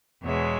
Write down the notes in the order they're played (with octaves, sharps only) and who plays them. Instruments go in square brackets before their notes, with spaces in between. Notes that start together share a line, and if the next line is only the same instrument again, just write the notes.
[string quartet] E2 B2 G#3 C#5 E5